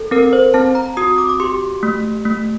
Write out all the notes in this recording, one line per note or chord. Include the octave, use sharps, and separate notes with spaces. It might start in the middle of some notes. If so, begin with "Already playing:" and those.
Already playing: A4
C4 A#4
C5
C4 A5
A#5
F#4 D#6
D6
D6
G4 C6
A3
A3